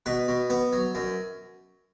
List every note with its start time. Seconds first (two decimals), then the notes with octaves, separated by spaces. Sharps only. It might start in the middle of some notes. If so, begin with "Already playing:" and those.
0.06 B2 B4
0.28 B2
0.50 B3
0.73 F#3
0.95 F#2